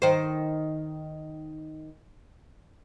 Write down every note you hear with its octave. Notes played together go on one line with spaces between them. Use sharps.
D#3 C5